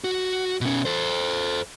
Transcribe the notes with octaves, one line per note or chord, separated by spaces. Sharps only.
F#4
B2 C#4
A4 C5